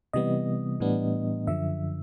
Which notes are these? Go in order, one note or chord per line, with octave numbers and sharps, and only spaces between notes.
C3 E3 G3 B3 D#5
A2 E3 G3 B3 D4
F#2 D3 F3 E5